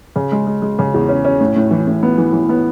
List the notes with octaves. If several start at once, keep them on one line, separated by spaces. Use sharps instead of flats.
C#3
G#3
G#3
G#3
C#3
E2
C#4
C#4
A2
A2
E3
A2
B3
E3
E3
B3